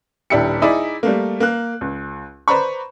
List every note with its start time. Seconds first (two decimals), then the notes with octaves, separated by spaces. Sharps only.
0.30 D#1 D4 E4 G4 C#7
0.62 D#4 E4 G#4 D5
1.03 G3 A3 A#3
1.40 A#3 F#6
1.81 C#2
2.48 B4 C5 D5 A#5 B5 C#6